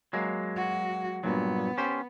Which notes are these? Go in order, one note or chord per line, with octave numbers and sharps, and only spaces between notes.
F#3 G#3 A#3
F#4
G2 A#2 F#3 B3
C#4 G4 C5